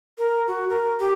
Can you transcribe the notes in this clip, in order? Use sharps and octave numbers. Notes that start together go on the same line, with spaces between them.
A#4
F#4
A#4
G4